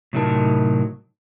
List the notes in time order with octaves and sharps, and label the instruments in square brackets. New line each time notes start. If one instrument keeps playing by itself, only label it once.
[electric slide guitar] A2 C3 F#3 D#4 A#4 A5